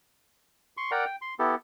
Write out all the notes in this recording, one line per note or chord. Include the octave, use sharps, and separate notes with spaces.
C6 C#6
A#4 D5 F#5 G5 A#5
G5
C6
B3 E4 G4 A4